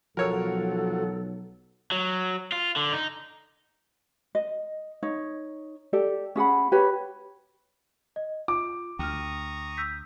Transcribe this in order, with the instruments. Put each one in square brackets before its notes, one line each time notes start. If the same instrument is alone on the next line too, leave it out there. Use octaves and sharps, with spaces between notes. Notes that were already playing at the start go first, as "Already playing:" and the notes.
[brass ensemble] B1 F#3 [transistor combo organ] F3 F#4 [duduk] A4 [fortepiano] A#4 C#5 E6
[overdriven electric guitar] F#3
F4
D3
D#4
[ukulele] D#5
D#4 C#5
G4 A4 D5
C#4 G#4 F#5 B5
G4 B4 C#5 B5
[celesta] D#5
[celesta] F4 [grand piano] D6
[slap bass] D2 [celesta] G5 F6 [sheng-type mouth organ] A#5 C#6 D#6
[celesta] E6 G6 B6